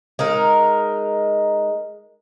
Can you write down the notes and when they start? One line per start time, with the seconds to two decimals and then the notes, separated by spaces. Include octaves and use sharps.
0.19 G#3 D#4 A#4